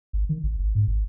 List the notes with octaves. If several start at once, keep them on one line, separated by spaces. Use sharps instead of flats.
G#1
D#3
A1
G#1
G#2
G#1